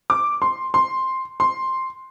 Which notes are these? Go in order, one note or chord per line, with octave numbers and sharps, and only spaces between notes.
D6
C6
C6
C6